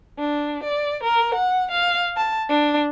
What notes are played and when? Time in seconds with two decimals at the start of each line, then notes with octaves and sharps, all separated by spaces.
0.18 D4
0.63 D5
1.02 A#4
1.34 F#5
1.71 F5
2.16 A5
2.48 D4